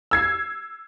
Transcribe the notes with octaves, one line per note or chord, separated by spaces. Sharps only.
E6 G#6 C7